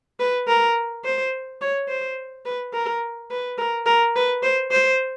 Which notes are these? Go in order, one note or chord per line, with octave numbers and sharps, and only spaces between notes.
B4
A#4
C5
C#5
C5
B4
A#4
B4
A#4
A#4
B4
C5
C5